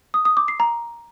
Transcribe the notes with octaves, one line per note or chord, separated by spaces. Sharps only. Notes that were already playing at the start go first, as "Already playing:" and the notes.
D#6
D#6
D6
C7
A#5